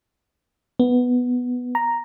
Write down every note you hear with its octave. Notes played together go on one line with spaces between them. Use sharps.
B3
A#5